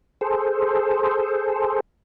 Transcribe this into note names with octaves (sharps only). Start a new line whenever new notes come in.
G#4 A4 C5